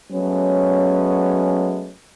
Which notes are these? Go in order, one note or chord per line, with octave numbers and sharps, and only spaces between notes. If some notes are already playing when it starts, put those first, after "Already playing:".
F#3 G#3 A3 B3 C#4